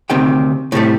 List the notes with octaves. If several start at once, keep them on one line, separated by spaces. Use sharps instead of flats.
D2 C3 D#3 G5
A2 C3 G3 A3